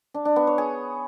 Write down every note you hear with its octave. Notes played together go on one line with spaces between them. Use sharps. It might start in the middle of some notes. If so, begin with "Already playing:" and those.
D4
D4
B3
C#5
G#4